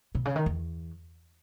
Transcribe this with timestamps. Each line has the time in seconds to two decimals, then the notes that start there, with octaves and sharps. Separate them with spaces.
0.15 B2
0.25 C#3
0.36 D#3
0.46 E2